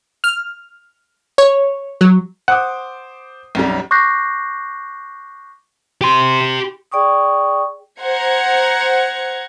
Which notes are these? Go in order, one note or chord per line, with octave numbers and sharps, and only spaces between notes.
F6
C#5
F#3
C5 F#5 D6 D#6
B1 F#2 G3
C#6 D6 F#6 G6 A#6 C7
G4 C6
G#4 D5 G5 C#6 D#6
C5 F#5 A#5 G#6 C#7